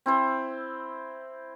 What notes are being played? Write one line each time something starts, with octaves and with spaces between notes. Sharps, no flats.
C4 E4 C5